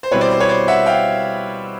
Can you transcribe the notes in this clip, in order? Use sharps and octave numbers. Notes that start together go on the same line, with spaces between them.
C5
B2 G3 C4 E4 B4 C#5
C5 D5
C5
B4 C#5
C5 D5
E5 F#5
F5 G5